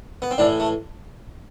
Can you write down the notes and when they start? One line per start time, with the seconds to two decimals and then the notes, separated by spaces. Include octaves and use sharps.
0.22 B3
0.31 C4
0.38 A2 E3 D4
0.60 A3